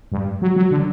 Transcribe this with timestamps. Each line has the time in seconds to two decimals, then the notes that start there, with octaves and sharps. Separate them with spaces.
0.12 G2
0.42 F#3
0.56 F#3
0.71 D3